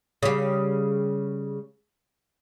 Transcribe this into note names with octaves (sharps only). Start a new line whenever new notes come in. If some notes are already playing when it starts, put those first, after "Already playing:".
C#3 G3